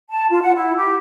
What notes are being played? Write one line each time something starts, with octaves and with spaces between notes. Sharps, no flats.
A5
F4
F#5
E4
G4